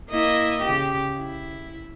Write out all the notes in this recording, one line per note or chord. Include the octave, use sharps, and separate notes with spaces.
A#3 E4 D#5
C#3 G4
E4